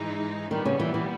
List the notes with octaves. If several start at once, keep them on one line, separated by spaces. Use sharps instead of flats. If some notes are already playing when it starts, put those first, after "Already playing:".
Already playing: G#2 E3 G#3 D#4
A#2 D#3 G3 B3
C#3
E3
E3